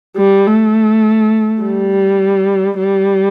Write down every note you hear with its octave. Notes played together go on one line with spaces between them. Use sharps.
G3
A3
G3
G3